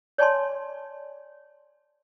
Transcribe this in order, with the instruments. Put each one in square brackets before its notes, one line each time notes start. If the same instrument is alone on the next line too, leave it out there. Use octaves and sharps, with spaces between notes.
[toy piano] C#5 D5 G#5 A5 C6